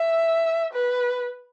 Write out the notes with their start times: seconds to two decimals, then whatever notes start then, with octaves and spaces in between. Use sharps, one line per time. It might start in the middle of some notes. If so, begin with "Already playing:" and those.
Already playing: E5
0.74 B4